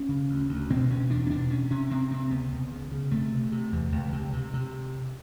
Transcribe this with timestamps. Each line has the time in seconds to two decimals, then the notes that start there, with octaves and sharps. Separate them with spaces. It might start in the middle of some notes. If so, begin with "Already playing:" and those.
Already playing: C#4
0.09 C#3
0.29 D2
0.49 D2
0.70 B2 C4
0.90 B2 C#4
1.10 E2 D4
1.27 C#4
1.30 B2 D4
1.50 C3 C#4
1.71 C3 C#4
1.90 C3 C4
2.11 C3 C4
2.31 C#2 B3
2.52 C#2
2.71 C#3
2.92 C#3
3.11 C3 A3
3.32 C3
3.52 C3
3.72 E2
3.92 C#2
4.13 C3
4.33 C3
4.54 C3